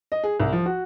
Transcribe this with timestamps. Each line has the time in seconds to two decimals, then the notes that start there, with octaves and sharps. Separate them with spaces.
0.12 D#5
0.24 G#4
0.40 C2
0.52 F3
0.66 F#4